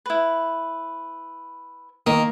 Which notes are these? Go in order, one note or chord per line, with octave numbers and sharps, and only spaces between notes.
E4 B4
D#3 A#3